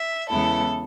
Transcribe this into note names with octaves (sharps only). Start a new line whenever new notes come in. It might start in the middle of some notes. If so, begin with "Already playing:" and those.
Already playing: E5
E2 C#3 G#3 B3 E4 A4